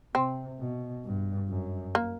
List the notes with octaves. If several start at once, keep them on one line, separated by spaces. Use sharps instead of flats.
C3 C4
B2
G2
F#2
A#3